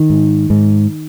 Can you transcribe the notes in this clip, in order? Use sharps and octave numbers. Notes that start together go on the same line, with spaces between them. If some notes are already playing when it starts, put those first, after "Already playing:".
Already playing: D#3
G#2
G#2